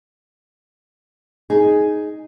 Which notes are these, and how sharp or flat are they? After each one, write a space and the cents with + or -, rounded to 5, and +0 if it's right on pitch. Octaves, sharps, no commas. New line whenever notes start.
D#4 +0 G#4 +5